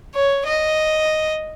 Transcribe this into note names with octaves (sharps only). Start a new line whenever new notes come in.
C#5
D#5